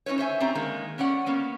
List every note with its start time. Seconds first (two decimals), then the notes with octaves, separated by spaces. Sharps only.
0.06 C#4 D#4 E4 B4 C#5
0.18 C5 C#5 E5 G#5
0.40 C4 D4 D#4 G4 C#5 A#5
0.55 D#3 G#3 A#3
0.98 B3 C#4 D5 F#5
1.26 A#3 B3 C#4